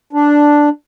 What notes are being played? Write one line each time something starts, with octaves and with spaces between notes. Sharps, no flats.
D4